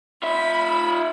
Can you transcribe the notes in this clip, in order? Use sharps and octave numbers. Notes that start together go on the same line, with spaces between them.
F4 E5 B5